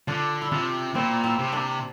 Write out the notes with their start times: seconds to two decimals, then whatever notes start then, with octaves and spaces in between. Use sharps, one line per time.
0.07 D3 D4 F4
0.42 E4
0.51 C3 D4 F4
0.94 A#2 C4 E4
1.24 C4 E4
1.39 C3
1.52 A#3 D4